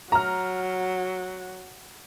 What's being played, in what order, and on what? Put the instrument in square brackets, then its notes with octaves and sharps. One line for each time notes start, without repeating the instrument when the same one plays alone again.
[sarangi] F#3 [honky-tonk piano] A#5 F6